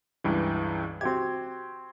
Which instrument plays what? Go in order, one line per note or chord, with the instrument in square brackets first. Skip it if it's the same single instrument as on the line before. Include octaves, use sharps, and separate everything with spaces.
[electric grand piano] C#2 G2 E3
[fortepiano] C4 F#4 G4 [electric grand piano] G#6